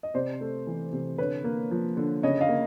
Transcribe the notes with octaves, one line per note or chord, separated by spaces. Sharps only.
D#5
C3 C5 D5
A3
E3
C3
D3 B4 C#5
A#3
F3
D3
C#3 C#5 D#5
D#5 F5
A#3